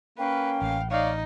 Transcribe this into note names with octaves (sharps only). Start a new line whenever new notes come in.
A#3 C#4 B4 G5
A1 F5
D#4 C#5 D5 F5